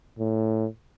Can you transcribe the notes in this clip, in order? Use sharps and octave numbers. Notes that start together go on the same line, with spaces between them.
A2